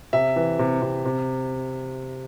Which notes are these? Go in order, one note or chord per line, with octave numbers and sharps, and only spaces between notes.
C3 E5
E3
C3
C3
C3